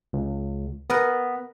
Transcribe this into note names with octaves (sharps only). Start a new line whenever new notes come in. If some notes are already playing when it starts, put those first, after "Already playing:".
C#2
B3 A#4 B4 D#5